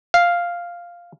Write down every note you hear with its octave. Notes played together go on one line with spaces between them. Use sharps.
F5